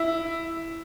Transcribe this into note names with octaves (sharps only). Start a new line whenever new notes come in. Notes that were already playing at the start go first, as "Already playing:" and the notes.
Already playing: E4